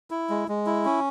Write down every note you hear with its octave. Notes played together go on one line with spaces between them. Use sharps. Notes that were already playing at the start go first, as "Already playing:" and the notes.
E4
G#3
G#3
E4
C#4